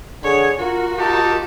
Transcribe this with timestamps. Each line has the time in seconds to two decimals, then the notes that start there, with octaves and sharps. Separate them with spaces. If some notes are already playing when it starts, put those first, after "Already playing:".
0.23 D3 G#4 C#5
0.59 F4 F#4 A#4
0.99 D#4 F4 G4 A#4 A5